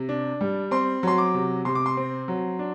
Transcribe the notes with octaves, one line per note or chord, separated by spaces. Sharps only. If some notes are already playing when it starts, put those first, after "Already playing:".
Already playing: C3
D4
G3
C4 C6
F#3 C6
D6
C3
C3 C6
D6
C6
C4
F#3
D4